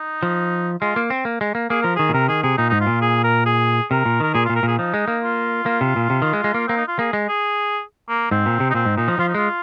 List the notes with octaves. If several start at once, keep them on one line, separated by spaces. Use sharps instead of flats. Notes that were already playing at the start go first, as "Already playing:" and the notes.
Already playing: D#4
F3
G#3 F4
A#3
C4
A#3
G#3
A#3
A#3 G#4
F3 A#4
D#3 G#4
A#2
C3 A#4
D#3 G#4
C3 G#4
A#2 D#4
G#2 D#4
F4
A#2
G#4
A#4
G#4
C3 A#4
A#2
D#3 A#4
A#2 G#4
A#2 F4
A#4
A#2 G#4
F3 D#4
G#3
A#3
F4
A#3
C3
A#2
C3
D#3
G#3
G#3
A#3
A#3 C4
D#4
F4
A#3 G#4
G#3
G#4
A#3
G#2 C4
A#2
C3
D#4
A#2 C4
G#2
A#2 D#4
F3
F3 F4
D#4
G#3 F4